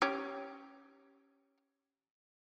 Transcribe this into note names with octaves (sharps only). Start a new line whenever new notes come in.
C#4 G4